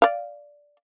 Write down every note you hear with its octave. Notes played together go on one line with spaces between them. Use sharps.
D5 F5